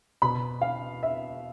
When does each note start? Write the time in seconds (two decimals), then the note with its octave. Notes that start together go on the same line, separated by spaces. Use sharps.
0.22 B2 B5
0.62 F5
1.03 E5